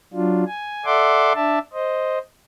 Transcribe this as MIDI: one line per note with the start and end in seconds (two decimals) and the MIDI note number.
0.14 0.44 54
0.14 0.44 62
0.14 0.44 65
0.47 0.85 80
0.85 1.33 69
0.85 1.33 74
0.85 1.33 76
0.85 1.33 78
0.85 1.33 84
0.85 1.33 86
1.35 1.59 62
1.35 1.59 74
1.35 1.59 76
1.35 1.59 81
1.73 2.19 72
1.73 2.19 75